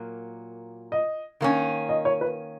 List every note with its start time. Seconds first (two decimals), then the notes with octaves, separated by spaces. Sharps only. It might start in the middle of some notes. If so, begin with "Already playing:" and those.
Already playing: A#2 F#3 A#3
0.92 D#5
1.41 D#3 A#3 C#4
1.89 D#5
2.05 C#5
2.21 B4